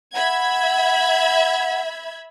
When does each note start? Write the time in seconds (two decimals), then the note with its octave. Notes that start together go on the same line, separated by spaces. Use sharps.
0.14 E5 F#5 B5 G#6